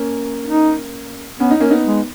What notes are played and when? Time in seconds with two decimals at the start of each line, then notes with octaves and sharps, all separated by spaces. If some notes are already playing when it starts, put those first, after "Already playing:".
Already playing: A#3 C#4
0.47 D#4
1.39 B3 C#4
1.51 D#4
1.60 A#3 C#4
1.70 B3 D#4
1.86 G#3